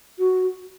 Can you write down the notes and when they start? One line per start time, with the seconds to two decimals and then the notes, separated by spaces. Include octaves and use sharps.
0.19 F#4